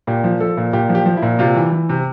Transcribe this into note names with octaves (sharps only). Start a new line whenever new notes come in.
A#2 G4
F3
F3 A4
A#2
A#2 G4
F3
G4
F3
E4
A#2
C3 F4
E3
E3
C3